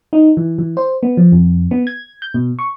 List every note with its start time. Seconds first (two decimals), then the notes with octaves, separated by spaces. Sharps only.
0.13 D#4
0.37 E3
0.58 E3
0.77 C5
1.03 B3
1.17 F3
1.32 F2
1.71 B3
1.87 G#6
2.22 G6
2.34 B2
2.59 C#6